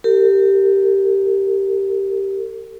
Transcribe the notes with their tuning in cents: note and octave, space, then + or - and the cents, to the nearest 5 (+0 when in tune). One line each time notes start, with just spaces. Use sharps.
G4 -5 A#4 -40